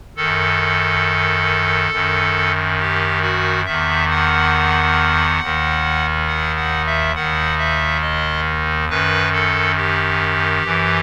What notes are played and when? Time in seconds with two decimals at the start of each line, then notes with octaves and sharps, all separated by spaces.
0.17 D#3 A4
0.22 F#2
1.91 F#2 D#3
2.79 G4
3.22 F#4
3.65 E2 D#3 E5
4.10 F#5
5.41 D#2 D#3
6.27 F#5
6.56 F#5
6.86 E5
7.15 D#2 D#3 F#5
7.58 E5
8.01 D#5
8.89 F#2 D#3 B4
9.32 A4
9.76 G4
10.64 F#2 E3